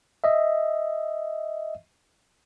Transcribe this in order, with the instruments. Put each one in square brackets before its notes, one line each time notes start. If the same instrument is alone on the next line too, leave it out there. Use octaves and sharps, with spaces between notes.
[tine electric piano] D#5 E5